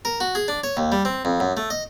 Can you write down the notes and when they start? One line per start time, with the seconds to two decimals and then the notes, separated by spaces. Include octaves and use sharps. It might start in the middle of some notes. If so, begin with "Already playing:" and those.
0.05 A#4
0.20 F#4
0.35 G#4
0.48 D4
0.64 C#5
0.77 D#2
0.92 G3
1.05 C4
1.25 F2
1.40 F#2
1.57 A3
1.70 D#5